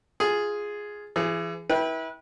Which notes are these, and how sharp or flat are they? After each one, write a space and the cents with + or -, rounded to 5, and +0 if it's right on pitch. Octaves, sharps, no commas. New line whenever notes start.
F4 +0 G#4 +0
E3 +35 G#4 +0
E4 -25 B4 -30 G5 +0